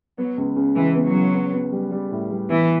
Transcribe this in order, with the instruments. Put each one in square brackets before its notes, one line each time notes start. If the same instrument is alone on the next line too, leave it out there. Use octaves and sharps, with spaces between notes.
[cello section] F#3 [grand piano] B3
[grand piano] C#2
C#3
[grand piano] C#2 [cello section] E3
[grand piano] B3
[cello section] F#3
[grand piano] C#3
B3
B3
G3
G3
A2
G3
[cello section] E3 [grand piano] B3